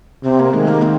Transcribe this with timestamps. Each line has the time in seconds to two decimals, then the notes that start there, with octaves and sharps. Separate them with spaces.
0.24 C3 C4
0.40 A#3
0.54 D#3 G#3
0.68 A#3
0.82 C4